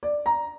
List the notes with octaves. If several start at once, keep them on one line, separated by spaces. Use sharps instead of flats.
D5
A#5